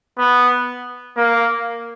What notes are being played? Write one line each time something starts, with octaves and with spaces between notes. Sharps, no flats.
B3
A#3